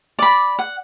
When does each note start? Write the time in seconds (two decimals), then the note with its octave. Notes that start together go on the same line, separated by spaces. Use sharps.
0.19 D5 B5
0.59 F#5